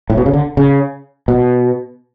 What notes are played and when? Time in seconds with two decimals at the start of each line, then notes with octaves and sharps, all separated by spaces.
0.10 A2
0.17 B2
0.26 C#3
0.33 D3
0.57 C#3
1.28 B2